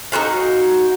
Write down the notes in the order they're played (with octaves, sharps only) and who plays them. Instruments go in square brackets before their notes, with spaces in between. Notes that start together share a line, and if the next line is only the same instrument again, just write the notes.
[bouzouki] D#4 F4 F#4 F5